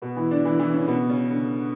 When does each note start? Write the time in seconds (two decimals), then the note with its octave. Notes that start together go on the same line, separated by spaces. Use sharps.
0.02 B2 B3
0.16 E3 E4
0.31 D3 D4
0.45 E3 E4
0.59 E3 E4
0.74 C#3 C#4
0.88 B2 B3
1.10 C#3 C#4
1.31 D3